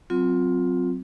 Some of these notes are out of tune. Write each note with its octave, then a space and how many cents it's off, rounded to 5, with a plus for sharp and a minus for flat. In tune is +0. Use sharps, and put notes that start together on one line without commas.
F#3 +0 C4 +0 F4 +20